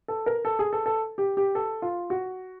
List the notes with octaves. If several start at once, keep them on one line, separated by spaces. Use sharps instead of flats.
A4
A#4
A4
G#4
A4
A4
G4
G4
A4
F4
F#4